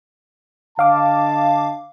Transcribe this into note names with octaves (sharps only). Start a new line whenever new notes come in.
D3 D#5 F5 A5 D6